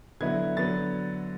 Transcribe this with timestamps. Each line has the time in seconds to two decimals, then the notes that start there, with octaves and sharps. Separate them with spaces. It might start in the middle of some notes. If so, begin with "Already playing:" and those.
0.21 D3 F#3 B3 E4 G#6
0.57 D3 F#3 B3 A6